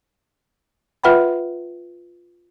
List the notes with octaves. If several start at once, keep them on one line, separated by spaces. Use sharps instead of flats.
F4 B4 E5 F#5 G5 B5